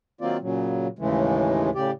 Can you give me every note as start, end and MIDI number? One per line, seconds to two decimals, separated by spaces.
0.21 0.37 51
0.21 0.37 54
0.21 0.37 58
0.21 0.37 60
0.21 0.37 65
0.21 0.37 74
0.42 0.87 46
0.42 0.87 49
0.42 0.87 54
0.99 1.70 39
0.99 1.70 45
0.99 1.70 49
0.99 1.70 52
0.99 1.70 56
0.99 1.70 57
1.75 1.91 45
1.75 1.91 49
1.75 1.91 67
1.75 1.91 74